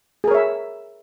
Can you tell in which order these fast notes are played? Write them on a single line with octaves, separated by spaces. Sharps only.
G#4 A#4 C#5 E5